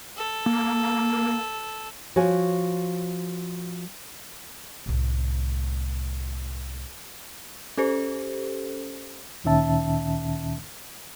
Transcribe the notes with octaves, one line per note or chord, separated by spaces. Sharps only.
A4
A#3
F3 F#4 C#5 G#5
C2 A2
C#4 G4 A4 C5
D2 A#2 D#3 C#4 E5 A5